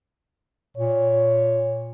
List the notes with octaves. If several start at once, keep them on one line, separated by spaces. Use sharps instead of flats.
A#2 C#5